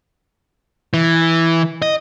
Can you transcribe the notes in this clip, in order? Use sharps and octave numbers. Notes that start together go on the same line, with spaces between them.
E3
D#5